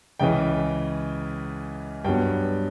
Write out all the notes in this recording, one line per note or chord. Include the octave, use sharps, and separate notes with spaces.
C#2 C#3 E3 G5
G2 F#3 B3 G5